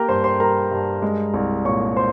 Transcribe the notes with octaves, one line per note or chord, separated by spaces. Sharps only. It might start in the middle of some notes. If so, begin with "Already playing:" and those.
Already playing: A#3 G4 A#4 G5 A#5
G2 C5 C6
C5 C6
G3 A#4 A#5
G2
G#3
C2
A#2 C#5 C#6
C5 C6